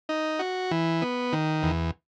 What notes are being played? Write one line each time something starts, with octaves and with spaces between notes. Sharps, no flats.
D#4
F#4
E3
B3
D#3
E2